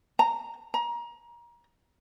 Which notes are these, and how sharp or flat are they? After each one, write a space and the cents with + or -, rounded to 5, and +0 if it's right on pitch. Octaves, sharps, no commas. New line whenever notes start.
A#5 -10
A#5 +25